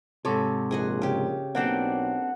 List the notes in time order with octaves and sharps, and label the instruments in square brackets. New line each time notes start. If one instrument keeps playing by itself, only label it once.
[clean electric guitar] G#2 C3 [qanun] A4 C#5
[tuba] A#1 [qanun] G#4 D#5 F#5
[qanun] C#3 G4
[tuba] B1 [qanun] A#3 D5 G5 [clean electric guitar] C4 D4 [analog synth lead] F#5